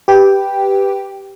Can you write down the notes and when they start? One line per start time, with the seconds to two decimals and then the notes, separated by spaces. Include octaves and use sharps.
0.08 G4 B4 G5